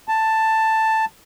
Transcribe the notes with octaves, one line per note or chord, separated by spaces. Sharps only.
A5